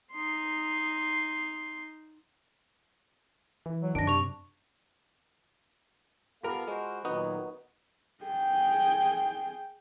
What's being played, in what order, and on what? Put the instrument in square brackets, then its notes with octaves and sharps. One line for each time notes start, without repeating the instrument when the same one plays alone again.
[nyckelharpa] D#4 C6
[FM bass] E3
[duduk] F#3
[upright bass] F#2 [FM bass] D#3 [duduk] D4 [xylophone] A#6 D7
[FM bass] C3 [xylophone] C#6 F7
[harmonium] B3 A4 F5 [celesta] F4 B5 D6 [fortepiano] G4 A#4
[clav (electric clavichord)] G#3 [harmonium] F#4 C5
[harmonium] A#2 D#3 F#3 [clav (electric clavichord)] B3 D#4 F#4
[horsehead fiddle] G#4 G5